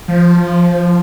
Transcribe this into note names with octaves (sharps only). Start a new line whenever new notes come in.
F3